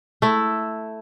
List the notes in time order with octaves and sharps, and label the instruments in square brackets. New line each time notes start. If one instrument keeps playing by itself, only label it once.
[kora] A3 E4